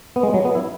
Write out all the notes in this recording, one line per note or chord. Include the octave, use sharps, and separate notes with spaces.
B3
G#3
F#3
B3
E4